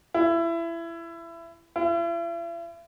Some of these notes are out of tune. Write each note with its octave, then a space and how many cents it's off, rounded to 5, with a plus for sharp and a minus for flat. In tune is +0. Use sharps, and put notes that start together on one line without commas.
E4 +25
E4 +45